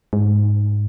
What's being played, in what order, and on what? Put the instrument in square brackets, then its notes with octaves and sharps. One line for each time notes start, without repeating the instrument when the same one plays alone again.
[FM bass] G#2